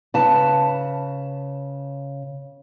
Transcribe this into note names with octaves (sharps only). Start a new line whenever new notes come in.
C#3 B4 A5